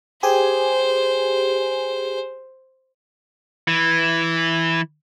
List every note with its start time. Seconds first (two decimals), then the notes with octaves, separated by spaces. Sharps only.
0.23 G4 G#4 C5 G#5
3.68 E3